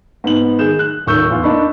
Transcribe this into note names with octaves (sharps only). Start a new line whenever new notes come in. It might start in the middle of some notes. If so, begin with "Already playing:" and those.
G#2 B3 F#7
D#3 G#4 G6 E7
F#6
D#1 D#3 A#4 C#6 E6 G6
E2 F4
A#3 D4 D#4 B5 C#6